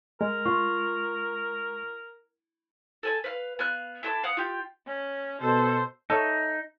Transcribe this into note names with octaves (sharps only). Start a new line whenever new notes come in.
G#3 A#4
F4 C#6
A4 G#5 A5
B4 F5
B3 F5 F#6
E4 A4 A5 D6
F5 F#5 D#6
F4 G4
C#4
B2 A4 C5
D#4 A4 C#5 E5